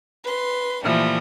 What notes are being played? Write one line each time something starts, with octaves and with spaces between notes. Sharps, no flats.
B4 C6
A#2 E3 F3 G3 A3